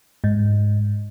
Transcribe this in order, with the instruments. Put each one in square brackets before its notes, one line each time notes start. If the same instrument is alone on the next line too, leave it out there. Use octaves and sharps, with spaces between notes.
[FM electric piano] G#2